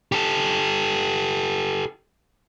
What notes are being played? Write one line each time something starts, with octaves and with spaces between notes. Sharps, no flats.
G4 A4